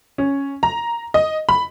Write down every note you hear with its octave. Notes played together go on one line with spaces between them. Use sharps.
C#4
A#5
D#5
B5